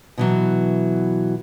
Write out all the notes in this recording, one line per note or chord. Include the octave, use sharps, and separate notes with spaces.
B2 E3 F#3